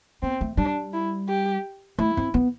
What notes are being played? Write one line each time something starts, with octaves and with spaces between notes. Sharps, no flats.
B3 C4
A3
G3 D4
E4
G4
A3 E4
C4
B3